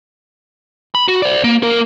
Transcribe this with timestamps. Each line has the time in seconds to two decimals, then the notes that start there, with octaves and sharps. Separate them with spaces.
0.95 B5
1.08 F#4
1.22 C5 D5
1.44 A#3
1.63 A#3 A#4